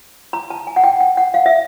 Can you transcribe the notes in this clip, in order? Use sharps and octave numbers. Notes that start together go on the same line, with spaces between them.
A#5
A5
G#5
F#5
G5
G5
F#5
F5
E5